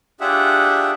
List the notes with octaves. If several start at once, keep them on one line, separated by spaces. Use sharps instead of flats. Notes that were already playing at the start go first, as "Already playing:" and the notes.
D4 F4 G4 G#4 E5 F#5